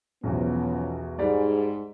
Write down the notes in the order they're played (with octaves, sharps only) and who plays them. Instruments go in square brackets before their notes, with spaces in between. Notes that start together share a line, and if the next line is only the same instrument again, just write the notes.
[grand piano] B1 E2 [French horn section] F3 B3 C#4
[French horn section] G#2 [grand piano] G3 D5